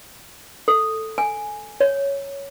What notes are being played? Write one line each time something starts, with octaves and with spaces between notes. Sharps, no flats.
A4
G#5
C#5